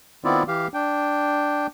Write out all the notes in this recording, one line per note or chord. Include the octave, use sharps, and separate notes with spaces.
D#3 B3 C4 E4 F4 D5
E3 G4 F5
D4 G5